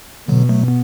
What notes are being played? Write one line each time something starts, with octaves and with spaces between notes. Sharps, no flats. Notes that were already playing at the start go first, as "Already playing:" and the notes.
B2 D3 F#3
F#3 A3
B3